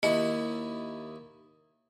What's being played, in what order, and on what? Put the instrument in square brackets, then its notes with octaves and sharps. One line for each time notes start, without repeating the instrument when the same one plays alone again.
[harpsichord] D#2 E4 [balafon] D#5